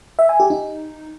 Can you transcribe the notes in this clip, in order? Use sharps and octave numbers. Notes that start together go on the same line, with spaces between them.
E5
G#5
G4
D#4